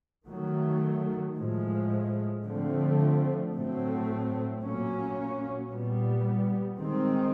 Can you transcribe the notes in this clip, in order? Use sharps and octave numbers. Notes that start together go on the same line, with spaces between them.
D#3 F#3 A3
A2 F3 G#3
D3 F3 A3 C4
A2 F#3 A3 C4
A#2 F#3 A#3 C#4
A#2 G3 B3
D#3 G#3 C4